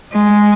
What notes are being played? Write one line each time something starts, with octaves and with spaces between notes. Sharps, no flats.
G#3